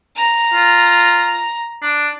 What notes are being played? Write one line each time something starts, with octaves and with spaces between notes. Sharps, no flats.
A#5
F4
D4